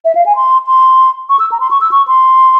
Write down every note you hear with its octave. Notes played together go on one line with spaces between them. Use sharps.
E5
F5
G#5
C6
C6
C#6
E6
A#5
C6
C#6
E6
C#6
C6